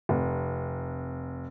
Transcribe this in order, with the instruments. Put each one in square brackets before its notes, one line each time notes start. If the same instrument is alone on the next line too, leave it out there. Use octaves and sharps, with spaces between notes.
[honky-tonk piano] F1